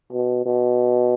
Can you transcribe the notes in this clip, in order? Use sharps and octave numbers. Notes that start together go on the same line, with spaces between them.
B2
B2